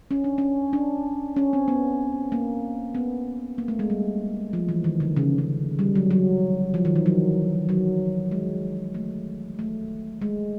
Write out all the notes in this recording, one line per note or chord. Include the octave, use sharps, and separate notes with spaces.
C#4
D4
C#4
D4
C#4
C4
B3
A#3
B3
A#3
A3
G#3
G3
F3
E3
D#3
D3
C#3
C#3
G3
F#3
F#3
F3
D#3
E3
F#3
F#3
G#3
A3
A3
G#3